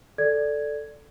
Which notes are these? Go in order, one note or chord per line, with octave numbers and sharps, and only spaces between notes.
A4 D5 G#6